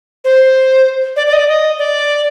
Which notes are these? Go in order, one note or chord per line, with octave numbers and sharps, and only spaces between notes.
C5
D5
D5
D#5
D5
D#5
D5